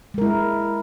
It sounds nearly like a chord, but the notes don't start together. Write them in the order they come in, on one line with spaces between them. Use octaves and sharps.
G#3 A#4 E4